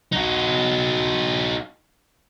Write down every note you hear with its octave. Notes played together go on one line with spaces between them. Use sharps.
D#4 F#4